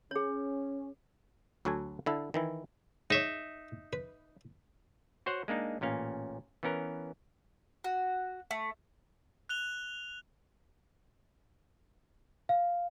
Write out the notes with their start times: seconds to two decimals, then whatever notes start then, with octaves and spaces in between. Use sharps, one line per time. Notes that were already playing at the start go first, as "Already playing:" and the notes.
0.11 C#4 G#4 C#5
1.65 D2 F#3 F#4 A4 G#5
2.06 D3 E4 A4
2.34 D#3 E3 E4
3.10 G#2 D#4 C#5 E5
3.93 B4
5.26 F#4 C5 C#5 F#5
5.48 G#3 A#3 D4 D#4
5.81 A1 A#2 C#4 F5
6.63 E3 B3 C#4 A#4
7.84 F#4
8.51 A3
9.49 F#6 F7 G7
12.49 F5